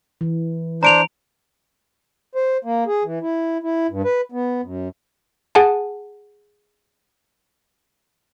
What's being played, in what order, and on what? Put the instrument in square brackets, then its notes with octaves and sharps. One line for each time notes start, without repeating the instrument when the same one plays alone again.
[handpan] E3
[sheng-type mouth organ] D4 C5 [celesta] A#5 D7 F7
[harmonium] C5
A#3
G#4
E3
E4
E4
G2
B4
B3
F#2
[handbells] G#4 F#5 G#5 A5